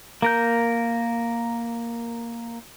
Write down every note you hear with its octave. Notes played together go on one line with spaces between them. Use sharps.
A#3 A#4 G6